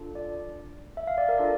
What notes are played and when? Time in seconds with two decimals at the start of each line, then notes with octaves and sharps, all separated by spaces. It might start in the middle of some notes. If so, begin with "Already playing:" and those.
Already playing: D4 F4 A4
0.15 D5
0.97 E5
1.07 F5
1.18 D5
1.29 A#4
1.38 D4 F4 A4 D5